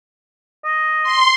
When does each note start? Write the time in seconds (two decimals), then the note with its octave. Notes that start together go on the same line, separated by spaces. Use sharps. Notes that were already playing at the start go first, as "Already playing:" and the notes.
0.65 D#5
1.03 C6